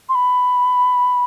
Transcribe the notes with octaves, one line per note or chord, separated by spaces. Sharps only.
C6
B5